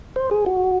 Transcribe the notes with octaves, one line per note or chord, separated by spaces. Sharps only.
C5
G#4
F#4